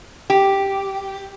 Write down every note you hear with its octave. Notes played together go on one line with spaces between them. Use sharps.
G4